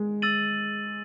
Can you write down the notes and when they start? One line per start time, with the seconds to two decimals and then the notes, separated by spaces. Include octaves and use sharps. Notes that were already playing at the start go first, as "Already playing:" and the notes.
Already playing: G#3
0.22 E6 A6 D#7 F#7